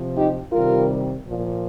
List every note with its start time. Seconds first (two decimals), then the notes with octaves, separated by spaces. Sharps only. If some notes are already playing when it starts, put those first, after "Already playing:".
Already playing: C3 F3
0.17 D#4 G4
0.52 C3 D#3 G3 F4 A#4
1.26 A#2 F3